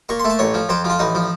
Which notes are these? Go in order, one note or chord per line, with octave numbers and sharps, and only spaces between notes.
A#2 C#6
C6
A3
A5
A1 C#5
F3
F2 C5
F3
F4
A1 D#4
F3